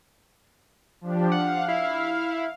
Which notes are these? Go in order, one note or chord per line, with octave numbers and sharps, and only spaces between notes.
F3 D4 G4
F5 F#5
E4